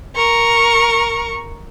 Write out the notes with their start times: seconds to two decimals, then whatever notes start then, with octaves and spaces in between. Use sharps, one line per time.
0.16 A#4 C#6